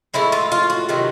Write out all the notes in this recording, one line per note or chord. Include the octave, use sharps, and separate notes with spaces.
A2 F3 G#3 E4
F4
F4
F#4
C3 D#3 F#3 A3